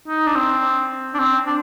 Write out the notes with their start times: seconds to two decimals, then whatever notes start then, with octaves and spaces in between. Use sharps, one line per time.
0.08 D#4
0.27 D4
0.35 C4
1.14 D4
1.19 C4
1.47 D4